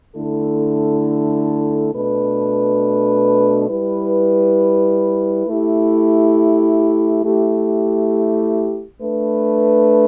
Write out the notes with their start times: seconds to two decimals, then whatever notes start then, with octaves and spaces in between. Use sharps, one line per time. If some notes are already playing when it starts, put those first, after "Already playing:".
0.15 D3 A3 E4 A4
1.92 B2 A3 D4 B4
3.70 G3 E4 B4
5.47 A3 E4 G4
7.25 A3 E4 G4
9.01 A3 D4 B4